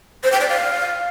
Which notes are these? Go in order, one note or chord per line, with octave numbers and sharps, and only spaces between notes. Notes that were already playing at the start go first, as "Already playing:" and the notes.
C5
G5
D5
F5